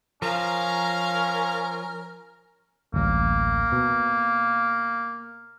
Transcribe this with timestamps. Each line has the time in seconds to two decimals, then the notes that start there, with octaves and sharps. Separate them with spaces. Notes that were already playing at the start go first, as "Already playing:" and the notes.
0.22 F3 C#4 A#4 F5 A#5
2.94 D1 A1 A#3
3.72 B2